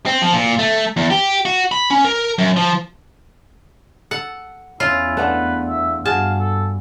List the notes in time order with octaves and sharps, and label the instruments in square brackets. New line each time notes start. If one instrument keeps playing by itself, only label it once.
[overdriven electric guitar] C4
F3
A#2
A3
E2
G4
F#4
B5
C#4
A#4
F#2
F3
[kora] A4 [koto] F#5
[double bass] E2 [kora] C#4 [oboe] E4 [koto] F4
[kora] A3 B3 D4 [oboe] B4
[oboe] E5
[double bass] G2 [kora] F#4 G#4 [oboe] F5 [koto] A5
[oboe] A4